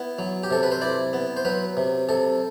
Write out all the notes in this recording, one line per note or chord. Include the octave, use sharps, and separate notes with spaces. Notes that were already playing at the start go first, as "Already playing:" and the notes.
Already playing: B3 E4
F#3
G4
C3 A4
B4
C5
E4 D5
B3
C5
F#3 B4
C3
C3 A4